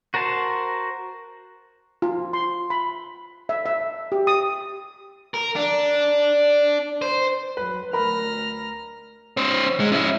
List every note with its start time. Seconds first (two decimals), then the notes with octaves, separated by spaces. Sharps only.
0.14 F#4 A#4 C5 A5
2.02 F4
2.33 C6
2.70 B5
3.49 E5
3.66 E5
4.12 G4
4.27 D#6
5.34 A#4
5.56 D4
7.02 C5
7.57 F#3 B4
7.93 D2 A#4 B5 F6 A#6
9.37 C#4 C5
9.80 G#2 G#3
9.92 C#4 E4